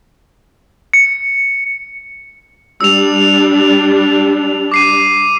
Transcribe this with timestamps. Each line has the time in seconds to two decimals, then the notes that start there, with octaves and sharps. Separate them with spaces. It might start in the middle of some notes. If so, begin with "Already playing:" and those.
0.94 C#7
2.81 G3 D4 E6 F7
4.72 D6 C7 D#7